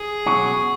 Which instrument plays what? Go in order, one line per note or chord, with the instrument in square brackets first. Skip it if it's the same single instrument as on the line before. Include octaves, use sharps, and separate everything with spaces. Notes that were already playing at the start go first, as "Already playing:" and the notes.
Already playing: [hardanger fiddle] G#4
[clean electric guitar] B2 F#3 C#4 F#4